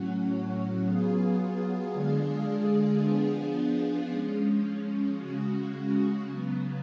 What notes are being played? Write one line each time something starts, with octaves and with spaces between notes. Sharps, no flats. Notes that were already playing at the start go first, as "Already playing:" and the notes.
Already playing: A2 F#3 C#4 F#4
F#3 B3 F4 G#4
D3 G#3 D4 F4 G#4
F3 B3 D4 F4 G#4
F3 G#3 C#4
C#3 G#3 C#4 F#4
C#3 F#3 B3